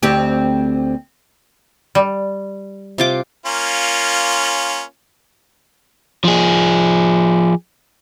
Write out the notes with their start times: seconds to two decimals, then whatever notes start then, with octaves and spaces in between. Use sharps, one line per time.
0.03 D2 C4 G4
1.95 G3
2.98 C3 F4 D6
3.46 A#3 C#4 F4
6.24 F3 G#4